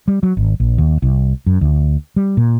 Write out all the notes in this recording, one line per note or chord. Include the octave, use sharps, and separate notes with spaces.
G3
F#3
G#1
A#1
D#2
C2
F#2
D2
G3
A#2